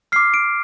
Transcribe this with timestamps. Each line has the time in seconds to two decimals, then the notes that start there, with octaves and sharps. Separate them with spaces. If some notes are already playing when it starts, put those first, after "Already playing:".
0.12 F6 C7
0.16 D6
0.34 D7